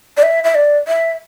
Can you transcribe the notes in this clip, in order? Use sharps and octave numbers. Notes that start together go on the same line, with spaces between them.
D5
E5
E5
D5
E5